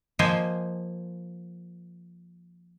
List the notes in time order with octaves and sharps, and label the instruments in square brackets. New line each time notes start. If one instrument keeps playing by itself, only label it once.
[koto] F3 A#3 C5 D#5 G#5